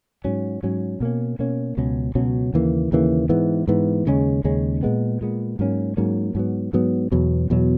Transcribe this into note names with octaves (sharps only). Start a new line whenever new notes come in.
G#2 F#3 C#4
G#2 F#3 C#4
B2 A#3 C#4
B2 A#3 C#4
C#2 B2 F#3 C#4
C#2 B2 F#3 C#4
D#2 C#3 E3 A#3
D#2 C#3 E3 A#3
G#2 E3 B3
G#2 E3 B3
D#2 C#3 G#3 C#4
D#2 C#3 G#3 C#4
A#2 G#3 B3
A#2 G#3 B3
G#2 F#3 A#3 C#4
G#2 F#3 A#3 C#4
G#2 F#3 B3
G#2 F#3 B3
E2 B2 F#3
E2 B2 F#3